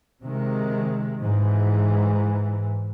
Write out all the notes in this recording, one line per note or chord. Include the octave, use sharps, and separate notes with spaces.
C3 D#3 G#3
G#2 E3